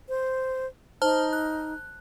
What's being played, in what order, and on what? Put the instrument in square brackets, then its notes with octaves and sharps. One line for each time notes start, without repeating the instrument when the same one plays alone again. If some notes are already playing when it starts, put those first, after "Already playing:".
[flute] C5
[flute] D#4 [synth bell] C5 A5 F6
[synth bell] F#6